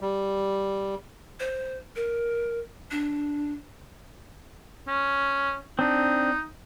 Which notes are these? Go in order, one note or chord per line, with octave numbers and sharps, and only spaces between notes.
G3
C5
A#4
D4
C#4
C4 D4 D#4